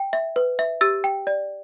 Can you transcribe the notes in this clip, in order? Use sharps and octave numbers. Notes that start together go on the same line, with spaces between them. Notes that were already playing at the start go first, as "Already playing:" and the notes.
Already playing: G5
E5
B4
E5
G4 E6 A6
G5
D5